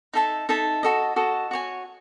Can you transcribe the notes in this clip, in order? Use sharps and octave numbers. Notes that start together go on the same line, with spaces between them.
D#4 A4 E5 A5
D#4 A4 E5 A5
F#4 A4 D#5
F#4 A4 D#5
F#4 C#5 G#5